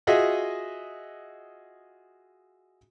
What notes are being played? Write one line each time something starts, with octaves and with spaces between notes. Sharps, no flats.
F4 F#4 G#4 D#5 E5